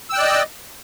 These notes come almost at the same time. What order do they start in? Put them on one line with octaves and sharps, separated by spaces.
E6 G5 F#6 D5 D#5